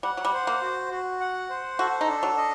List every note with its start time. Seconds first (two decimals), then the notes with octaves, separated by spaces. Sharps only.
0.03 G3 F#5
0.17 F#3
0.25 G3
0.33 C5
0.47 A#3
0.62 F#4
0.91 F#4
1.20 F#5
1.49 C5
1.79 F#4 A4
2.01 D#4
2.08 D4
2.23 F#3
2.37 D#5